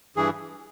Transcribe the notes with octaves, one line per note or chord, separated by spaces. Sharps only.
G2 E3 G#4